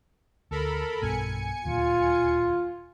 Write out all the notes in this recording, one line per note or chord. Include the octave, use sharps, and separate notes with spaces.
D2 A4 A#4 B5
B1 G2 B2 G#5 C#7
D1 D#2 A#2 F4